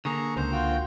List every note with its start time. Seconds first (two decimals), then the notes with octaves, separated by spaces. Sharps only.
0.05 D3 A#3 G#4 A#5 C#6
0.37 C#2 C5
0.52 F4 F#4 G5